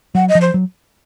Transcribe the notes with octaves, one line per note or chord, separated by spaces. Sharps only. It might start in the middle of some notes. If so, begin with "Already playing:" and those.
F#3 F#5
D#5
F3
C5
F#3